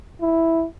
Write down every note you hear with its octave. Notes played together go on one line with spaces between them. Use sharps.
E4